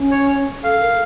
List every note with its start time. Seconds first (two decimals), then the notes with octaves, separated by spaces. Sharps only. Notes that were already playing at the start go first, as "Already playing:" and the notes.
Already playing: C#4
0.11 C#5
0.64 A4 F5
0.81 A#4